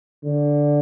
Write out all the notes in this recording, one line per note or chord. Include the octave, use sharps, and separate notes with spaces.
D3